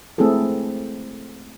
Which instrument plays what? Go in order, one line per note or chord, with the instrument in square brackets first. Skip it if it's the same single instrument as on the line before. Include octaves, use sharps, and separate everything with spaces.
[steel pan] G#3 A3 C4 E4 G#4 A4